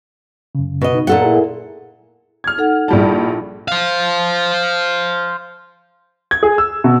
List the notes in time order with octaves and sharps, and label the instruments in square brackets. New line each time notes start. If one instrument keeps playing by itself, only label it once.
[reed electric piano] F#2 C#3
[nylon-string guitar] B2 D#5
[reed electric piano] D#4
[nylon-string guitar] A#2 A4 F#5
[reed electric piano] E4 G#4 A#4
[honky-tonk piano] F6 G#6
[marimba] D#4 A4 F#5
[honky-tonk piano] A#1 G3 A5 [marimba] E4 F4 G#4
[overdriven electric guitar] C5 F5
[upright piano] G#6
G#4
E6
B2